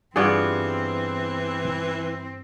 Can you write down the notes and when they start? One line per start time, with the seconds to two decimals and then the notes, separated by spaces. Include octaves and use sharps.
0.16 G2 E3 B3 C4 F4 G#4 D5